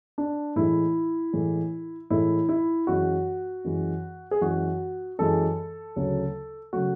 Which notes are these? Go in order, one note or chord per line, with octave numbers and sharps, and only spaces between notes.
D4
A2 E3 G#3 E4
A2 E3 G#3
A2 E3 G#3 E4
E4
F#2 E3 G#3 F#4
F#2 E3 G#3
G#4
F#2 E3 G#3 F#4
F#2 E3 G#3 A4
D2 C#3 F#3 A3
C#3 F#3 A3 F#4